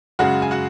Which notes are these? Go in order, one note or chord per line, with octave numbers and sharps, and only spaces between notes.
F#2 C#3 G#3 F#4 F#5
G#5
F#4 F#5